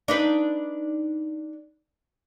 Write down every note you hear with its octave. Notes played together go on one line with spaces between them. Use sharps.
D4 D#4 B4